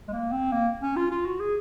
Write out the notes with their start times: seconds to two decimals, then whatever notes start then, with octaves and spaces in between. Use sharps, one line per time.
0.08 G#3
0.13 A#3
0.32 C4
0.52 A#3
0.81 C#4
0.96 F4
1.11 F4
1.25 F#4
1.40 G#4